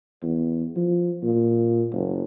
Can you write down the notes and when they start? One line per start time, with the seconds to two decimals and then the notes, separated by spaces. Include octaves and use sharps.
0.23 E2
0.76 F3
1.23 A#2
1.93 F#1